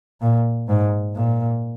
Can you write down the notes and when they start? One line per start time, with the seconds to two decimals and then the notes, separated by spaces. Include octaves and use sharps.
0.21 A#2
0.69 G#2
1.16 A#2